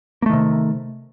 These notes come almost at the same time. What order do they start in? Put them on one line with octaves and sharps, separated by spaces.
A#3 A3 D#3 C3